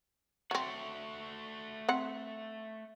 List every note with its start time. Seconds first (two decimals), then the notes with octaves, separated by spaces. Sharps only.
0.51 F#3 A3 C4 F#4
1.89 C4 F#5